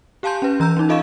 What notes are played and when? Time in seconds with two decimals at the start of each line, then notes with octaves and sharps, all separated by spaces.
0.23 G4 F5 G#5 A5 C6 G6
0.42 C#4 B4
0.60 E3 A#5 E6 G6
0.77 C#4 D#4
0.89 F4 A4 D#5 F5 C#6 E7